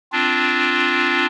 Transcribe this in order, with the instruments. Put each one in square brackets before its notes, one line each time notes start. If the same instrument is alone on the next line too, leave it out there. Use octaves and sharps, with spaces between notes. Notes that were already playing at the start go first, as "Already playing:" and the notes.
[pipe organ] C4 D4 F4